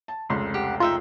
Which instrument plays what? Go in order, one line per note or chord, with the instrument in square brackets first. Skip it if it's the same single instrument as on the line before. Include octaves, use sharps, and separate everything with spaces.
[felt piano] A5
F1 C#2 C6
[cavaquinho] G4 F#5
[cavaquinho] D#4 E5 G5 [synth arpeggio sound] F4